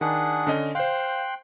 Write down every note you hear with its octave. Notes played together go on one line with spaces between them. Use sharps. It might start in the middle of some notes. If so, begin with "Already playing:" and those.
D#3 D4 G#4 F#5
D3 C#4 D#5
C5 F5 G5 C6 F#6